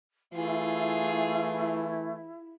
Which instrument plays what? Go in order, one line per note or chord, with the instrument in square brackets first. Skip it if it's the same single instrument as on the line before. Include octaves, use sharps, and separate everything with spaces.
[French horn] E3 [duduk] A3 [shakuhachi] E4 [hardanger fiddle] F4 G#4